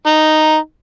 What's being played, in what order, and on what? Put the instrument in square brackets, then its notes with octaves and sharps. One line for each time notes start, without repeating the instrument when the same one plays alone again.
[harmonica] D#4